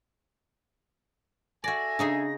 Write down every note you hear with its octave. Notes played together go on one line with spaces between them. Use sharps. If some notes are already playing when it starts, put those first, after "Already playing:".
F#4 A4 D5 E5 G#5 A#6
C#3 D4 D#4 G#4